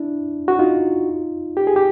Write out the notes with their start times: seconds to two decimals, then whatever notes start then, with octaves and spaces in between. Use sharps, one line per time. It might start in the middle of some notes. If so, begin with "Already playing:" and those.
Already playing: D4 E4
0.48 F#4
0.59 D#4 F4
1.57 G4
1.67 G#4
1.76 G4